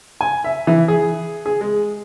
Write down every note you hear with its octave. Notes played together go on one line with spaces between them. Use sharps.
G#5
E5
E3
G#4
G#4
G#3